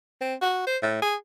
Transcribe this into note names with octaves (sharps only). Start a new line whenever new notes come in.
C4
F#4
C5
A2
G#4